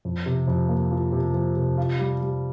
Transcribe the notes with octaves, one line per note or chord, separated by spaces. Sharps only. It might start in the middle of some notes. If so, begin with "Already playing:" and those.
F2
C3
F2
A#3
F3
C3
F3
C3
F4
G3
G3